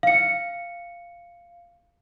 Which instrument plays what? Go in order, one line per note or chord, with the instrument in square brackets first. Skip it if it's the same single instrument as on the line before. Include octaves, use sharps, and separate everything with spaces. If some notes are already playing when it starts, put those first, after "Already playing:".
[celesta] F5 C#7